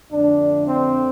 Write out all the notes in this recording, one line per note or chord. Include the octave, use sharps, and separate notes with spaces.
F2 D3 A3 D4
C4